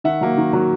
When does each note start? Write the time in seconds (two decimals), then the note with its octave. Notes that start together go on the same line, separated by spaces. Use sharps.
0.04 D#3 E5 F#5
0.21 F#3 A#3
0.37 D#3
0.53 F#3 A#3